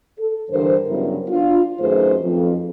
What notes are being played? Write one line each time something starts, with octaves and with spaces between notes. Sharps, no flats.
A4
G2 D3 E3 A#4 C5
G2 C#3 F#3 B3 E4 A#4
D4 F4
F#2 D#3 A3 G#4 B4 C5
F2